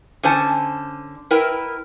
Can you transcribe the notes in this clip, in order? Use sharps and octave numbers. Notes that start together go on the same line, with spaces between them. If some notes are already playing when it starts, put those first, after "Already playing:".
D3 C#4 C5 G#5 A5
E4 A#4 B4 G5